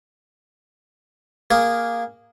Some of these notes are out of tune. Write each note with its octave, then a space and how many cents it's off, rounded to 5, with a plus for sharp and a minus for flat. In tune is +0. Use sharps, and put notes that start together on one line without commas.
A#3 +0 G#4 -15